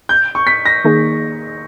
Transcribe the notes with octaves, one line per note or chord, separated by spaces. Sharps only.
G6
C#6
B6
A#6
D#3 A#3 D#4 G#4